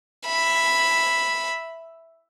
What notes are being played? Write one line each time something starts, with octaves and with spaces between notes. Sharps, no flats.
E5 B5